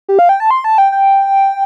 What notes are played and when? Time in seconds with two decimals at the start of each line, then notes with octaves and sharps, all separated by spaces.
0.09 G4
0.19 F5
0.29 G5
0.40 A5
0.51 C6
0.64 A5
0.78 G5
0.92 G5